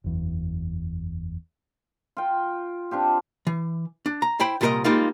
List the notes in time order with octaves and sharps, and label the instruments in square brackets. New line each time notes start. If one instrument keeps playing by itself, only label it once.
[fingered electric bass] F#1 E2
[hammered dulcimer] F4 G5
C4 D4 F4 G4
[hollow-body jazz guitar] E3
D4
A#5
E4 C5 G5 B5
C2 A#2 E4 A4 A#4 D#5
G3 G#3 A#3 D#4 F4